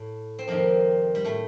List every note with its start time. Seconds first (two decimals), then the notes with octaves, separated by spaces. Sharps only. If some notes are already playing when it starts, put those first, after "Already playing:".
Already playing: A2
0.39 C4
0.48 F2 C3 D#3 A#3
1.15 G3
1.25 A2 A3